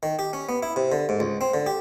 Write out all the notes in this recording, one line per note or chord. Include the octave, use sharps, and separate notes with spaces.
D#3
G4
C#4
B3
E4
C3
D3
G#2
C#2
C4
D3
G4